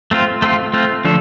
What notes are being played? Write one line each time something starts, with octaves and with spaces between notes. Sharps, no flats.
A3 C4 F4
A3 C4 F4
A3 C4 F4
D3 F3 A3 D4 A4